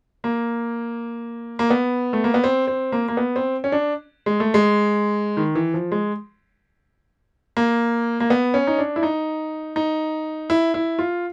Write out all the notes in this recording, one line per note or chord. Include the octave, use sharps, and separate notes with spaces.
A#3
A#3
B3
A3
A#3
B3
C4
C4
A#3
A#3
B3
C4
C#4
D4
G#3
A3
G#3
D#3
E3
F3
G#3
A#3
A#3
B3
C#4
D#4
D4
E4
D#4
D#4
E4
E4
F4